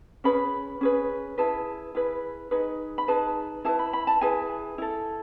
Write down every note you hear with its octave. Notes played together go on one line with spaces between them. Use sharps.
C#4 G#4 B4 B5
C#4 G#4 B4
E4 G#4 B4 A5
E4 G#4 B4
D#4 G#4 B4
B5
D#4 G#4 B4 A5
E4 G#4 B4 A5
B5
B5
A5
E4 G#4 B4 G#5
E4 A4